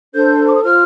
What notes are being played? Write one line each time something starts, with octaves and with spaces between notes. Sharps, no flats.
D4 A4 C5 G6
D6
D#6
F4 C5 F6